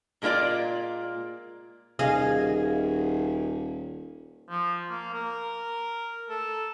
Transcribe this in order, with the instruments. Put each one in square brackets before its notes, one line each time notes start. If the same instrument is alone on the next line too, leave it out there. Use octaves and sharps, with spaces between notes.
[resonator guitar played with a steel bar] A#2 G#3 A#3 F4 D5
[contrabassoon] D#1 [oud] G#4 D#5 F5
[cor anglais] F3
A#3
A#4
A4